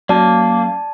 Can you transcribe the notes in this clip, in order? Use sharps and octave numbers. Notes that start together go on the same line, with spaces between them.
F#3 A#3 C#4 D5 A5